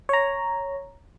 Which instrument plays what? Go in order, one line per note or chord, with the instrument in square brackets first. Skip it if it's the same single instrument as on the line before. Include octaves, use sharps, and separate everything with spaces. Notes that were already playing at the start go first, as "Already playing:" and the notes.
[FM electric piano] C#5 A#5